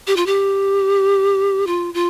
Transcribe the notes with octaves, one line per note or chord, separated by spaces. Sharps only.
G4
F4
G4
F4
F4